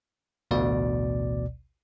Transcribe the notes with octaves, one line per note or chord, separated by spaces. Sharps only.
A1 D2 B2 D5